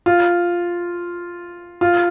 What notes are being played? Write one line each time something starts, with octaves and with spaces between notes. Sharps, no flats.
F4
F4